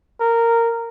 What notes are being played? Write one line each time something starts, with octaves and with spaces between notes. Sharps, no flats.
A#4